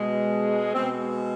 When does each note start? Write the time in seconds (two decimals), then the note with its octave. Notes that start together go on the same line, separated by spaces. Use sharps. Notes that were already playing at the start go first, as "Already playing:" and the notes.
Already playing: B2 G#3
0.74 B2 G#3 C4